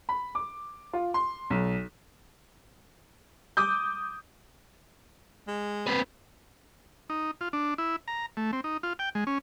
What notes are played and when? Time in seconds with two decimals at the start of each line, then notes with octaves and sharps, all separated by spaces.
0.09 B5
0.35 D6
0.93 F4
1.14 C6
1.50 B1
3.57 D6 D#6 G6
5.47 G#3
5.87 C4 B4
7.10 D#4
7.41 F4
7.53 D4
7.78 E4
8.08 A#5
8.37 A3
8.53 C4
8.64 D#4
8.83 F4
8.99 G5
9.15 G#3
9.27 C#4